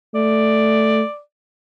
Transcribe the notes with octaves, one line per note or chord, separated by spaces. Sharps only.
A3 D5